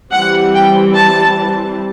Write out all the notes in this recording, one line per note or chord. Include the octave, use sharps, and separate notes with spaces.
E3 G3 C4 F#5
G5
A5